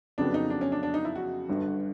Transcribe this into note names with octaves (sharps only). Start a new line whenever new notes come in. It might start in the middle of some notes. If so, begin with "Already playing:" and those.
F2 C#3 F#3 B3 D4
D#4
D4
C#4
D4
D4
D#4
E4
F#4
G1 G2 D3